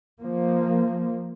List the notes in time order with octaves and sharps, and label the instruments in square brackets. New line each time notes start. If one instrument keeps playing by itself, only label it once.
[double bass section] F3 A#3